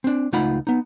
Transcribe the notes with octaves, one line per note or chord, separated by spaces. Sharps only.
C4 D4
C#2 A3 D#4 F4 F#5 B5
B3 D#4